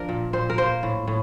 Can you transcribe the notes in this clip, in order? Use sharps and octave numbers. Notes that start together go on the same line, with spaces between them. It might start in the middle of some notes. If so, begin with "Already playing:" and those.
Already playing: F3 D4 A#4
A#2
A#2 C5
A#4
A#3 C5
A2
A2